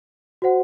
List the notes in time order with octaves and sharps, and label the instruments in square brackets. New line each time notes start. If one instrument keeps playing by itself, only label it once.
[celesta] F#4 C5 F#5